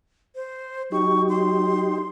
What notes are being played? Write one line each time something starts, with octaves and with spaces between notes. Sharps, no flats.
C5
F#3 D#4 G4 C#6
C6